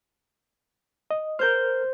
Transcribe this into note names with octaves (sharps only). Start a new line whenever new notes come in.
D#5
A#4 C5 F6 G6